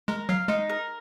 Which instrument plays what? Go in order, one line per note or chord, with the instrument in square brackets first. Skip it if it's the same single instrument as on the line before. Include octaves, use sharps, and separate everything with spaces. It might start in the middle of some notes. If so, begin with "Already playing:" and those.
[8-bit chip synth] G#3 [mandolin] A#4
[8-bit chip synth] F#3 [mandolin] F5
[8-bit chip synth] G#3 [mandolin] D#4
[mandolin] A#4